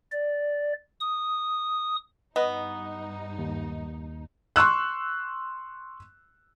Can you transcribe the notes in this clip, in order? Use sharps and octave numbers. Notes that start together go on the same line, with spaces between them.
D5
D#6
G2 B3 D#4 D#5
D#2
C6 C#6 E6 F#6